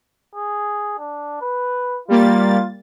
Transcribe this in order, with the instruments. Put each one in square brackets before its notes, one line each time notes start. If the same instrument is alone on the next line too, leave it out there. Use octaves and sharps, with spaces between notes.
[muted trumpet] G#4
D4
B4
[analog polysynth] G3 A#3 A6 [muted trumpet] F4